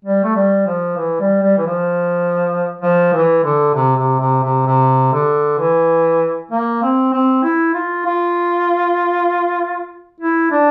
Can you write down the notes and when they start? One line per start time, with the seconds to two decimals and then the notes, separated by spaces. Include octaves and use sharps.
0.05 G3
0.24 A3
0.36 G3
0.66 F3
0.97 E3
1.20 G3
1.43 G3
1.58 E3
1.66 F3
2.82 F3
3.13 E3
3.44 D3
3.75 C3
3.97 C3
4.20 C3
4.44 C3
4.66 C3
5.13 D3
5.59 E3
6.51 A#3
6.82 C4
7.13 C4
7.43 E4
7.74 F4
8.06 F4
10.21 E4
10.51 D4